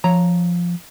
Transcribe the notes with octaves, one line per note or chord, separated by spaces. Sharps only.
F3 C#5 A#5